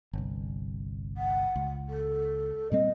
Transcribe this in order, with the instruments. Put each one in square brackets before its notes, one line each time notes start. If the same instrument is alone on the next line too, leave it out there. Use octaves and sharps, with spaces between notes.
[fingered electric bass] G1 C2
[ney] F#5
[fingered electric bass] C#2
[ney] A4
[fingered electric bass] A#2 G3 C4 [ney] D#5